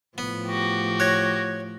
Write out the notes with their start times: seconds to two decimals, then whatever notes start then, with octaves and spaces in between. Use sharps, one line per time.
0.18 A2 F3 B3
0.48 F#4 G4
1.00 C#5 F#6 G#6 A#6